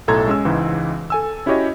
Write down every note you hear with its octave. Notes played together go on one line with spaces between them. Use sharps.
B1 A2 A4 A#5 C6 G#6
G#3 C#4 E6
C#2 G#2 E3
A4 G#5 E6
C#4 E4 F#4 G4 C#5 D#5